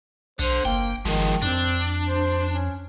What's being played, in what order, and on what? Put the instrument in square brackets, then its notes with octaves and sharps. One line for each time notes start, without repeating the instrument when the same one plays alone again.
[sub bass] B1 [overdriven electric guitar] D3 [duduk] C5
[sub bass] F#1 [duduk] A#3 [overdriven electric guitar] G5
[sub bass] G1 [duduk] D#3 [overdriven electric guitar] F3 G#3
[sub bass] F2 [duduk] C4 [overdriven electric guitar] D4
[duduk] C5
C#4